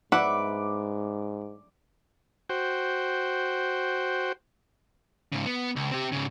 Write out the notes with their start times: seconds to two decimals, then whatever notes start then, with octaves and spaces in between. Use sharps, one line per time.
0.12 G#2 B4 E5 F#5 D6
2.49 F#4 C5 G5
5.33 G#2 C#3
5.46 B3
5.76 C#2
5.91 C4 G4
6.12 G#2 C#3